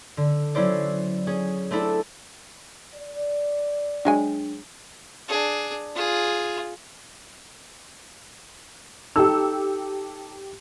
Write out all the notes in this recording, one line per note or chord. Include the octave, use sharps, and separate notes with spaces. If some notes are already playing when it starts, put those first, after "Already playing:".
D3
F#3 C#4 E4 C5 D5
C#4 G#4
A3 C4 D4 E4 A4
D5
F#3 G#3 D4 G#5
D4 G#4
F4 G#4
D#4 G4 A4 E6